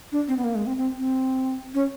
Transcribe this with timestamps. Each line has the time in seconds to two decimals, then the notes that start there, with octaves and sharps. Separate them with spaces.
0.12 D4
0.28 C4
0.37 B3
0.44 A#3
0.55 G#3
0.66 C4
0.77 C4
0.99 C4
1.74 C#4